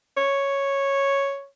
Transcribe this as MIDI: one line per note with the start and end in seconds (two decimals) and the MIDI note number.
0.17 1.46 73